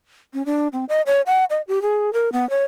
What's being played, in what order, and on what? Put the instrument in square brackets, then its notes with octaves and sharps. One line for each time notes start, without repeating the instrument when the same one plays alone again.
[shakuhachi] C#4
D4
C4
D#5
C#5
F#5
D#5
G4
G#4
A#4
B3
C#5